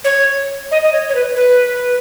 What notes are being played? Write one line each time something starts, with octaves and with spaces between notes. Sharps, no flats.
C#5
D#5
D#5
C#5
C#5
B4
B4